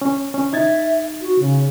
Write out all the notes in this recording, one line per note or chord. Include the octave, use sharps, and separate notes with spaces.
C#4
C#4
D#4 E5 G#6 A6
F#4
C#3